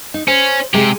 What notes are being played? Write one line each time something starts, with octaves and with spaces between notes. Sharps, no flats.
D#4
C#4 C5
C3 G#3 G4